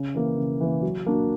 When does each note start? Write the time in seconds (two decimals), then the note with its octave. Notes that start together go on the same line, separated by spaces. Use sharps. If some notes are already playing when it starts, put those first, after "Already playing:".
Already playing: C#3
0.14 E3 A#3
0.37 C#3
0.61 E3 A#3
0.82 F#3
1.06 A#3 D4 F#4